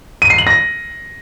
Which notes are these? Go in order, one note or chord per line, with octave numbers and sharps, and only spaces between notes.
D#7
C7
F#7
A#6